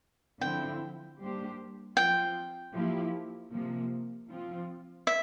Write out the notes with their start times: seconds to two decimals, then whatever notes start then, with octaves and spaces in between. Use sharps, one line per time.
0.41 D3 F3 C4 E4 G5
1.19 G3 A#3 D4 G4 C5
1.96 F3 C4 F4 G5
2.74 F3 A#3 E4 G4
3.52 C3 F3 A#3
4.30 F3 C4 F4
5.07 E5